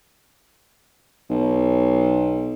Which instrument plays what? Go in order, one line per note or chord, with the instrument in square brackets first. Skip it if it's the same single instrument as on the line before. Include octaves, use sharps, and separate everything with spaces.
[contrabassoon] B1